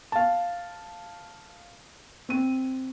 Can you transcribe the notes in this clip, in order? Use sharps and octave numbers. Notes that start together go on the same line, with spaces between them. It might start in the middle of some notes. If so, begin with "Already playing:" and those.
F5 A5
C4 D#7